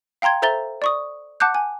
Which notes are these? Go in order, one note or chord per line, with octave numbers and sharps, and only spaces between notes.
F5 G5 A#5 C6 G#6
A4 C5 E5 A#5 A6 G7
D5 C#6 D#6
F#5 A5 D6 F#6 G6
G#5